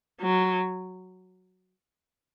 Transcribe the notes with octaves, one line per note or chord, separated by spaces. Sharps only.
F#3